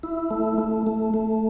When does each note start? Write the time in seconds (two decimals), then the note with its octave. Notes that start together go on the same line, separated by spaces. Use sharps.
0.03 E4
0.30 A3
0.58 A3
0.87 A3
1.14 A3